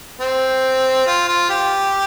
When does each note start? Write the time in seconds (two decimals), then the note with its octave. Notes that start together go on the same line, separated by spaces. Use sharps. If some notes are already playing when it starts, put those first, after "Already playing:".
0.20 C4
1.07 F4
1.27 F4
1.50 G4